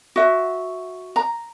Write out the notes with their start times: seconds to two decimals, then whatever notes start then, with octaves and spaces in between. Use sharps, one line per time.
0.16 F#4 E5
1.16 A#5